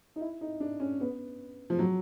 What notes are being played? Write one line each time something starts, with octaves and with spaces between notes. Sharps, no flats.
D#4
E4
D#4
D4
C#4
B3
F3
F#3